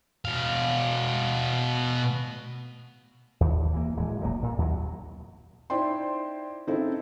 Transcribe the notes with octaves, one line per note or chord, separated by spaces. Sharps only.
B2 F5
D#2
E3 A#3
D1 G#3
E1 A#1 F#3 A#3
A#2
D#2 F#3
D#4 E4 C5 D5 G5 C6
C#3 C4 D#4 E4 A4